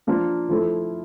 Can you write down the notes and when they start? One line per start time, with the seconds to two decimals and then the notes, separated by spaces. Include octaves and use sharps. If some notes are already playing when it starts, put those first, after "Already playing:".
0.07 F3 A#3 D4 F4 C5
0.49 F3 A3 E4 A4 C5